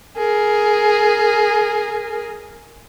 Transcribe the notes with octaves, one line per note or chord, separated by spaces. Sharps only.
G#4 A#4